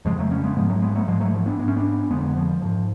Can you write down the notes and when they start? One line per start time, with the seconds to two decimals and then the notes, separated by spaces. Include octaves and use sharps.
0.05 F2 C#3 F3 G#3
0.19 F#3 A3
0.31 A3 C#4
0.44 G#3 B3
0.56 G#2 F3 G#3
0.69 F#3 A3
0.82 G#3 B3
0.95 F#3 A3
1.08 G#2 F3 G#3
1.20 F#3 A3
1.34 F3
1.46 B3 D4
1.59 G#2 D4
1.68 C#4
1.76 B3 D4
2.10 F2 D3 G#3 B3
2.36 F3
2.62 G#2 F3